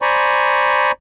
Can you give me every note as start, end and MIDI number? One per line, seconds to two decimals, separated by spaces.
0.02 0.92 72
0.02 0.92 74
0.02 0.92 80
0.02 0.92 82
0.02 0.92 83
0.02 0.92 85